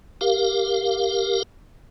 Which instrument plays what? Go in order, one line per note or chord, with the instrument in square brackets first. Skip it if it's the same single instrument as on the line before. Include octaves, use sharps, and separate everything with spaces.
[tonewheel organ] G4 A#4 F5